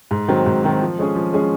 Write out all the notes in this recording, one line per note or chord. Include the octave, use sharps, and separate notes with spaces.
G#2
D#3 F#3 C4
G#2
D#3 F#3 C4
F3
G#3 C#4 G#4
F3
G#3 C#4 G#4